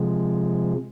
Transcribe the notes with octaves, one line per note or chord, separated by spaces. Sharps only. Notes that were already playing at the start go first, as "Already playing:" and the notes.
Already playing: C3 F3 G#3